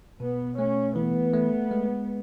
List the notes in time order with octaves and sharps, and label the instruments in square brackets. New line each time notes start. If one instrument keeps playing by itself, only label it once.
[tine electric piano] B2 [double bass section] B3
[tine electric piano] A3 [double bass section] C#4
[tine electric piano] E3 [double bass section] B3
[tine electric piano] A3
G#3